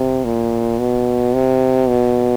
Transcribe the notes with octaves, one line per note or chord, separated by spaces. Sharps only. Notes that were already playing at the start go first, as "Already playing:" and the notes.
Already playing: C3
A#2
B2
C3
B2